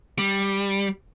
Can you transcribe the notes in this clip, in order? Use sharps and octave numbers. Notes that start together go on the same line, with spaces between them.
G3